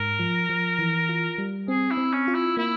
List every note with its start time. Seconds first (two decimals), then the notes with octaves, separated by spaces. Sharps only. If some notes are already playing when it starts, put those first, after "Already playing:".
Already playing: G#2 A#4
0.19 F3
0.49 F3
0.79 E3
1.09 F4
1.38 G3
1.68 C4 G#4
1.91 E4
1.97 C4
2.13 C#4
2.28 F4
2.34 E4
2.57 A#3 E4